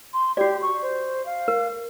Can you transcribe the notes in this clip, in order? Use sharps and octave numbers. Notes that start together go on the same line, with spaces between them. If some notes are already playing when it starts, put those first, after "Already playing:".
C6
F#4 G4 D5
C#6
C5
F5
A#4